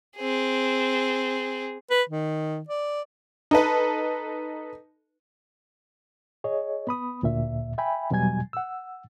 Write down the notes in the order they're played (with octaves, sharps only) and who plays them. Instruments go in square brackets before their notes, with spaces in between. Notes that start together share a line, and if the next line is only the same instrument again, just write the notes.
[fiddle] C4 G#4
[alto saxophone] B4
D#3
D5
[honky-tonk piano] D#4 A4 B4
[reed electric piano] G#4 C#5 D#5
B3 B5 D#6
D2 A#2 E5
E5 G5 G#5 B5
E2 B2 F#3 G3 G#5 G#6
F#5 E6